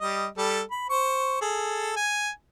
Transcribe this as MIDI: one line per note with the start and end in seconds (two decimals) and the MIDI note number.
0.01 0.27 55
0.01 0.27 75
0.38 0.62 55
0.38 0.62 69
0.71 0.86 83
0.90 1.38 72
0.90 1.38 85
1.41 1.94 68
1.41 1.94 69
1.96 2.30 80